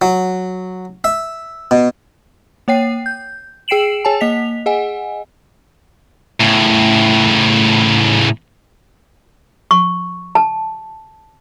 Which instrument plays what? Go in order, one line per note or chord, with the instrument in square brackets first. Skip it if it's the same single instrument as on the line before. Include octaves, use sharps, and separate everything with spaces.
[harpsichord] F#3
E5
B2
[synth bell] A#3 C#5 G5 C7
G6
G#4 G5 C7 D7 E7 F#7
G#4 C#5 G#5 A5
A#3 D#5 B6 F7
G#4 D#5 F#5 G#5
[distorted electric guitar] A2 C#3
[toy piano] C#6
A5